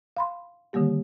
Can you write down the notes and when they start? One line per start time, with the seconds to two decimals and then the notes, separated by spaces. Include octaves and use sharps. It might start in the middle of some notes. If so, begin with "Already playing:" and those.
0.17 F5 B5 C6
0.73 D3 D#3 G3 A#3 G4